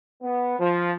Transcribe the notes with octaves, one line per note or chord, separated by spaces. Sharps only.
B3
F3